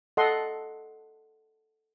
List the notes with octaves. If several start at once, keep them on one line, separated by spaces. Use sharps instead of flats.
A4 D#5 F#5 C6